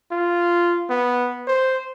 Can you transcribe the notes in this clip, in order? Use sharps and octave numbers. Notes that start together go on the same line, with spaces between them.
F4
B3
C5